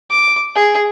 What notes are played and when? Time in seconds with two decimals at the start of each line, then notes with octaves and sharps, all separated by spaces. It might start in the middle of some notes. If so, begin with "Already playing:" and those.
0.10 D6
0.56 G#4